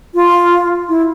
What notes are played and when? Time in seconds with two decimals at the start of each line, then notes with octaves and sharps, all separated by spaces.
0.14 F4
0.89 E4